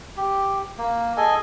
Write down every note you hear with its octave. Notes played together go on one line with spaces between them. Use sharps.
G4
A#3
G#4 A4 D#5 G#5